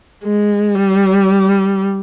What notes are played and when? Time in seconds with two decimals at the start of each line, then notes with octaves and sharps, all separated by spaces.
0.24 G#3
0.75 G3